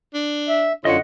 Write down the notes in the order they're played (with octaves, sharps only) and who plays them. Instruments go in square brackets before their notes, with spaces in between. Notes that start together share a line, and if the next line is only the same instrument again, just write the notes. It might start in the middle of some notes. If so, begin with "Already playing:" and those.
[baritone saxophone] D4
[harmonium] E5
[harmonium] F#2 F4 C#5 [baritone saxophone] D3 [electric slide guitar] D#5 F#5